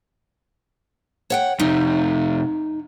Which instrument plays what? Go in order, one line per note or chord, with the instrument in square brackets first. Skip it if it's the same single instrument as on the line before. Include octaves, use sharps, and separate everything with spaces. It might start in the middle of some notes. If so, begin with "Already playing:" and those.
[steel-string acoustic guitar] C#5 F#5 G5
[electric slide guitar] F2 C3 [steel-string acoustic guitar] D#4